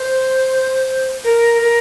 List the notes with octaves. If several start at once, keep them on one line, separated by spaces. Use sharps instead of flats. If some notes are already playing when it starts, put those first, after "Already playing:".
Already playing: C5
A#4
A#4